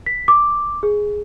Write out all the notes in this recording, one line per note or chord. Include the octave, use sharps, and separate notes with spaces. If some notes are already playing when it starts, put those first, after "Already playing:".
B6
D6
G#4